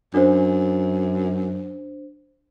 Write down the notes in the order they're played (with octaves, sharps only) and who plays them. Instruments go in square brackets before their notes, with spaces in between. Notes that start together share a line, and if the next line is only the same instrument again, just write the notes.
[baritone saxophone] F#2 [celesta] D4 C5